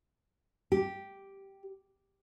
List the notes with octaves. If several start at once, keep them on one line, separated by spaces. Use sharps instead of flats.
G4